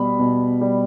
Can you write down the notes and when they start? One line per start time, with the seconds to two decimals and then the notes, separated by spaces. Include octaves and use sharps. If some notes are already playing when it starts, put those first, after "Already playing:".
Already playing: B2 G3 B5
0.19 B2
0.61 G3